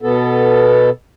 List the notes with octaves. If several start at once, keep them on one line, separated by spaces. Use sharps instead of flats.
B2 B3 A4